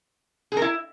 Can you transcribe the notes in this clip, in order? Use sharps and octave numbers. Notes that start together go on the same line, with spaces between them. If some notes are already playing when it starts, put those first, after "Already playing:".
G#4
A#4
E4